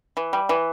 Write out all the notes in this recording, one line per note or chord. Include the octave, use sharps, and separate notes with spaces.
E3
G3
E3